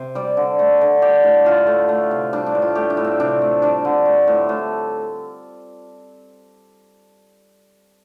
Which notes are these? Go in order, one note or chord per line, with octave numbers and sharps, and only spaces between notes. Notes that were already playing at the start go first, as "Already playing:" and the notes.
Already playing: C3
G3 D5
D3
A3
D3
G3 G4
A2
D3 F4
A3
A3
C3
G3 D4
D4
A2
F4
A3 G4
D4
A2
C4
C3 D4
A3
G3 D4
D3
A3
A2
A2